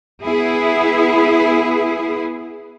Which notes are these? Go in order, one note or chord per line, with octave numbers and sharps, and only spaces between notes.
B3 E4 G#4